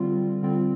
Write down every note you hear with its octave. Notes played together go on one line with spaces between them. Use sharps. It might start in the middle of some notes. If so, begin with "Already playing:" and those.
Already playing: D3 G3 C4 F4
D3 G3 C4 F4